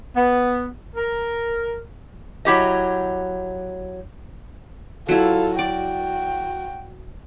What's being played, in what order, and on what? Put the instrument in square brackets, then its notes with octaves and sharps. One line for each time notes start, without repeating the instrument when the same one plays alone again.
[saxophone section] B3
A#4
[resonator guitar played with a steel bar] F#3 E4 G4 D#5
[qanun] F#3 E4 [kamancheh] F4 A4
[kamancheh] F#4 G5 [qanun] D5